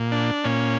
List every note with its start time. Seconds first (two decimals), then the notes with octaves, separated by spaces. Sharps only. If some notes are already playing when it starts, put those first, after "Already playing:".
Already playing: A#2
0.12 D4
0.44 A#2 C#4